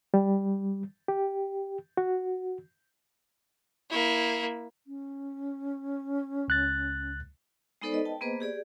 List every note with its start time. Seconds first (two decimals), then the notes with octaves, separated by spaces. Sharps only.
0.14 G3
1.08 G4
1.97 F#4
3.90 A#3 E4
4.86 C#4
6.48 C#2 F#6 A6
7.81 G#3 B3 D#4 A4 C5 D5
7.93 B4 D#5
8.05 G5 A5
8.21 A#3 B3 G#4 B4 C5 D#5
8.40 G4 G#4 D5